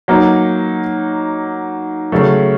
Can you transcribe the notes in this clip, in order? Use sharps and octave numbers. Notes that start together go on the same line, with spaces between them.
F#3 A#3 D#4
C#3 F#3 A3